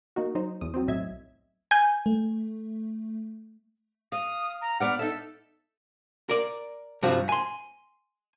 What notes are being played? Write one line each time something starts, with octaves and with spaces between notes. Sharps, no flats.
A#3 D#4 F#4
F#3 D#4 C5
E2 D#6
F#3 C4
B1 A2 F#3 D#5 E5 G#6
G#5 G6
A3
F5 D#6
A#5
B3 D5 F#5 F6
D#4 A4 E5
A#4 D5
G2 C3 F3 F#4
G#5 C6